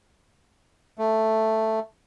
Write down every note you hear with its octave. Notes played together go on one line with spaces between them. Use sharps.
A3